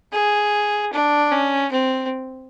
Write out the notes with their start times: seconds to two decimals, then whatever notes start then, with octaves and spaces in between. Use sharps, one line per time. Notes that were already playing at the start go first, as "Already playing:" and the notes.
0.13 G#4
0.93 D4
1.32 C#4
1.71 C4